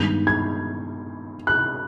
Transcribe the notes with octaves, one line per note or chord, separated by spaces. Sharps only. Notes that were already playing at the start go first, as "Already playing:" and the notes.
Already playing: G2 D#3 G#3 B3 G6
G#6
F#6